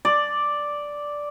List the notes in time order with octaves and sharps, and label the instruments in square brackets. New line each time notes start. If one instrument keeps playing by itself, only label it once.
[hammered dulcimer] D5